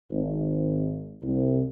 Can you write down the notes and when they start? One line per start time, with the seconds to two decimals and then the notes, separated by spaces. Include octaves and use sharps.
0.11 G#1
1.23 C2